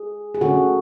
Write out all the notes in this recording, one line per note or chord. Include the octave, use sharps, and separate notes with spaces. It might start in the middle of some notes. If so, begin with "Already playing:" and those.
Already playing: G#4
G#4
D3 A3 C#4 F#4 A4